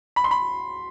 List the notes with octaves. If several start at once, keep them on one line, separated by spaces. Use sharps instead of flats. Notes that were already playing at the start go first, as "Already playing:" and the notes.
B5
C6
B5